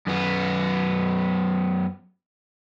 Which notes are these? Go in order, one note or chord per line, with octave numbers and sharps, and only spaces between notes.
F#2 B3